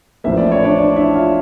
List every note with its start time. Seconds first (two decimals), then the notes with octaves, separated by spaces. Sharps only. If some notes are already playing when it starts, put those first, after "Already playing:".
0.24 A1 A2 F3 A#3 C#4 E5
0.37 D5
0.51 C#5
0.64 D4 D5
0.78 D4 D5
0.96 E4 E5
1.15 F4 F5